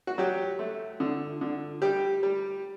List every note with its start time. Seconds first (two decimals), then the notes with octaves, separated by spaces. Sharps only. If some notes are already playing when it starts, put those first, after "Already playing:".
0.07 F#4
0.18 F#3 G4
0.59 A3
1.00 D3
1.41 D3
1.82 G3 G4
2.23 G3